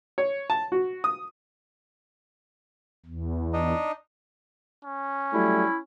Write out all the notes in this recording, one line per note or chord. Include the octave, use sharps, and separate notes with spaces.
C#5
A5
F#4
D#6
E2
D4 D#4 D#5
C#4
F#3 G3 A3 E4